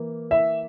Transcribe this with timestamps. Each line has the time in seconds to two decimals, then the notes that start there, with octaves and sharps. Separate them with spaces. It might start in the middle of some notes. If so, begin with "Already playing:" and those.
Already playing: E3 A#3
0.31 E5